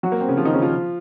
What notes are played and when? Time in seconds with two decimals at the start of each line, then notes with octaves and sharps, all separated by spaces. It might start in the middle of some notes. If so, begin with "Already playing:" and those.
0.03 F#3 F#4
0.12 A#3
0.20 C4
0.28 C#3 C#4
0.37 F3 F4
0.45 D#3 D#4
0.54 C#3 C#4
0.62 F3 F4